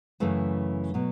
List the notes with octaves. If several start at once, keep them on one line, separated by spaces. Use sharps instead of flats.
F#2 C#3 E3 A3
B2 F#3